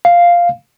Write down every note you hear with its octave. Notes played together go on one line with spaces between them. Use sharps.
F5